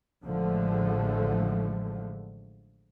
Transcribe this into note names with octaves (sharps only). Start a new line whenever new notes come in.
A1 A2 D3 F3 G#3 A3